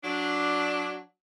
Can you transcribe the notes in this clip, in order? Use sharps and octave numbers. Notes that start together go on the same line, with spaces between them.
F#3 D4